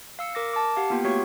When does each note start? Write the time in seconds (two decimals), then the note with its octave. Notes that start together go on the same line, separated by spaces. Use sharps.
0.19 F5 E6 C#7
0.35 A#4 D6 A#6
0.54 A5 D6
0.77 G4 F5 F#5
0.90 A#3 B3 F4 G4 G5
1.04 A3 B3 F#4 G4 C#5 C#6